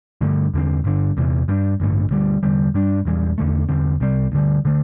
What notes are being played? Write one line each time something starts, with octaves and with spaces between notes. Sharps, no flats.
G1 G2 D3 A3
E2 D3 C4
G1 G2 D3
E2 C3 E3
G2 G3 D4
A1 G2 D3 A3
D2 D3 G3
E2 D3 G3
G2 G3 D4
E1 E2 E3 G3
E2 D3 A3
E2 D3 C4
C2 C3 G3 C4
D2 D3 G3
D3 A3